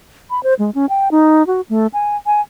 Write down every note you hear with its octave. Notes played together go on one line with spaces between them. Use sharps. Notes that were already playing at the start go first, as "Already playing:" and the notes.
B5
C5
G#3
C#4
G5
D#4
F#4
A3
G#5
G#5